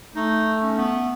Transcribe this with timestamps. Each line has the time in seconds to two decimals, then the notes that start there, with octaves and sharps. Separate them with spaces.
0.15 A3 D#4
0.62 C#4
0.77 B3